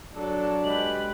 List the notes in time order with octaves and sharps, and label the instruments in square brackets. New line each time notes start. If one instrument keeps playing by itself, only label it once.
[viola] F#3 A4 [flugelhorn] D4
[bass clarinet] G#3 [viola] G4 B4 [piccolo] F#7